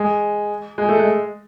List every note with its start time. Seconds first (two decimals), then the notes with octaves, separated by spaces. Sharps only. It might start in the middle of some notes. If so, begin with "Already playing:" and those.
Already playing: G#3
0.78 G#3
0.89 A3
0.99 G#3